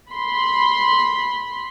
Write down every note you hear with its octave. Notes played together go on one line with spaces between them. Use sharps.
B5 C6